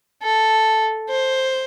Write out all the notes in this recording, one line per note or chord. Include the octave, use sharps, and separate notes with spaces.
A4
C5